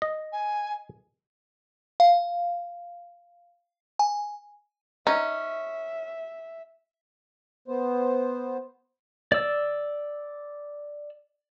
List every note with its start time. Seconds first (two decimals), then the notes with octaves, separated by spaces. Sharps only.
0.02 D#5
0.32 G#5
2.00 F5
3.99 G#5
5.07 C#4 D#4 E5
7.68 B3 C5
9.32 D5 E6